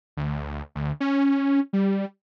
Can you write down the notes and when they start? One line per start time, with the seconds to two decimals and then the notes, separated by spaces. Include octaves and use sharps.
0.17 D2
0.75 D2
1.00 C#4
1.73 G3